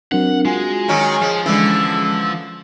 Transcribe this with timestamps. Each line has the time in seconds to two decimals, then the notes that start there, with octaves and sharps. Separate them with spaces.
0.12 F#3 C4 D4 A#4 F#5
0.45 G#3 F4 F#4 G#5
0.88 D#3 F#3 C#4
1.21 F3 G#3 F6
1.46 D3 E3 G#3 C#4 E6